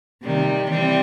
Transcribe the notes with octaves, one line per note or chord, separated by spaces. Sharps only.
C3 D#3 G3
E3 G3 C4